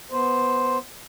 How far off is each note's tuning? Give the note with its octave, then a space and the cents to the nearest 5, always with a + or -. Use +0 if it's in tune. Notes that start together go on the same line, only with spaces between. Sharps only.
B3 +0 C5 +0